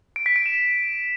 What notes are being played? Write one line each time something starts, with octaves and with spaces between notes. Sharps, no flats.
D7
B6
D7
E7